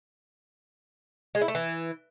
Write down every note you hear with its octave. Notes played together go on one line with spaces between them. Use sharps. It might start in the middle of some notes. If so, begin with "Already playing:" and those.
G#3
E4
A3
E3